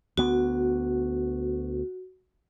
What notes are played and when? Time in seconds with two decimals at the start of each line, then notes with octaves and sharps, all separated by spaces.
0.17 D2 B3 F#4